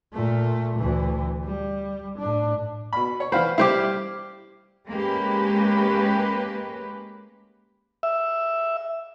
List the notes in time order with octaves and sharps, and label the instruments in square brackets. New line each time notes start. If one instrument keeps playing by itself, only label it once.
[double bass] A#2 A3
D2 E3
G3
A2 D4
[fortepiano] B2 B5
C#5
[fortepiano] E3 F5 B5 [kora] C5
[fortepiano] G3 E4 [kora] G4 C5 F5
[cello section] G#3 A#3 C#4 G4 B4
[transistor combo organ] E5